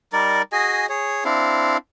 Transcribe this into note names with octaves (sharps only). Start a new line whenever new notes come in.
G3 D#4 A#4 D5
F#4 G#4 D#5 G#5
G#4 C#5
C4 D4 E4 F5